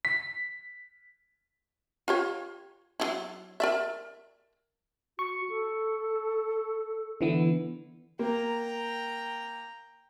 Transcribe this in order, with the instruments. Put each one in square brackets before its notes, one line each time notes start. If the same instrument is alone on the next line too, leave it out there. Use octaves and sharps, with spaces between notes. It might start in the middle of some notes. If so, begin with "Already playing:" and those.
[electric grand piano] B6
[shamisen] F4 G4 C#5
F#3 D#4 E4
A#4 D5 E5
[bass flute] F#4 [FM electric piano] C#6
[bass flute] A4
[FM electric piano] D3 E3 B3 [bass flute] E4
[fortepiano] A#3 [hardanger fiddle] G5 A#5